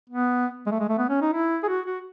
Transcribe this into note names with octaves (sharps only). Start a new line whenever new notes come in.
B3
G#3
A3
G#3
A3
B3
C#4
D#4
E4
G#4
F#4
F#4